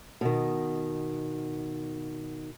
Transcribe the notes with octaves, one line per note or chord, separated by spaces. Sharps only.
B2 D#3